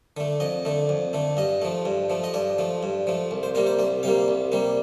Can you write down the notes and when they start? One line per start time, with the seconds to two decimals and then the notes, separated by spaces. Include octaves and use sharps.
0.17 D3 A3
0.40 F2 D#5
0.65 D3 A3
0.89 F2
1.13 D3 A3
1.37 G2 D#5
1.62 F3 A3
1.85 G2
2.10 F3 A3
2.24 D#5
2.34 G2 D5
2.58 F3 A3
2.83 G2
3.07 F3 A3
3.31 C2
3.43 C5
3.55 C3 G3 A#3 A#4
3.67 C5
3.79 C2 D5
4.03 C3 G3 A#3 F5
4.28 C2
4.52 C3 G3 A#3